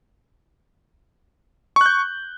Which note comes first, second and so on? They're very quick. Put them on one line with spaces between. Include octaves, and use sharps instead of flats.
C#6 F#6 G6